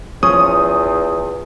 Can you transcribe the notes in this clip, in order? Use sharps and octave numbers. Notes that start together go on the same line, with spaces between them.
E2 F3 C#4 C#5 D#6